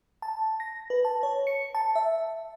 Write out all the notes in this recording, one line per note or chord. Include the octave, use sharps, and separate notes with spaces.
A5
A#6
B4
A5
C#5
C#7
A5
E5